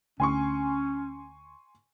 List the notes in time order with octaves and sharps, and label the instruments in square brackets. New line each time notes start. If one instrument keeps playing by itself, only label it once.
[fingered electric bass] D2 [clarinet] C#4 [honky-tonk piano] G#5 C6 C#6